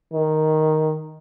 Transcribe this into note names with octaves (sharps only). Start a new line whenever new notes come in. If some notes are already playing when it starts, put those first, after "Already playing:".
D#3